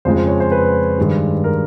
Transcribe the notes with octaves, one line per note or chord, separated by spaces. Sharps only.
F2 C#3 F3 G#3 C5
C5
C#5
C5
B4
G2 D#3 G#3
A#4